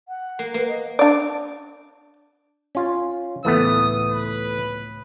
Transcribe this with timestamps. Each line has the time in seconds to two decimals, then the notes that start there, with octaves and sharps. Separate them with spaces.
0.08 F#5
0.39 A#3
0.54 A#3 B4
0.69 D#5
0.99 D4 D5
2.75 C#4 F4
3.45 C#2 A2 E3 A3 B3 D#6
4.12 B4